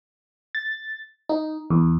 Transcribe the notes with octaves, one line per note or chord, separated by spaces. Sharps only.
A6
D#4
E2